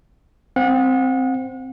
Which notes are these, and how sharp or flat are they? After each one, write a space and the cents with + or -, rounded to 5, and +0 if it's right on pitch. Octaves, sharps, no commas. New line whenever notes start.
C4 +0 F#5 -35